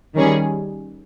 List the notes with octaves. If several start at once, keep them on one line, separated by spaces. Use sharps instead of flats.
D#3 G3 C#4 G#4